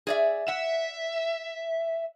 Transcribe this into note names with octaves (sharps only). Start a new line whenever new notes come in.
G#4 D5 E5
E5 F#5